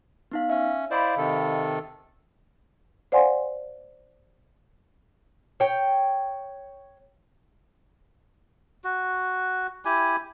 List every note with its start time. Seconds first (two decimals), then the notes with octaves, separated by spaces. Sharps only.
0.31 B3 D#4 F5
0.49 C#4 E5
0.91 E4 C5 D5 D#5 F5 B5
1.17 C3 D#3 A4
3.12 C5 D5 F5 F#5 G#5 C6
5.60 C#5 G5
8.84 F#4
9.85 E4 G4 G#5